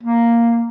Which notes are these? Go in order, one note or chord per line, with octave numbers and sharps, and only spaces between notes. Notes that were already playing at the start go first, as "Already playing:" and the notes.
A#3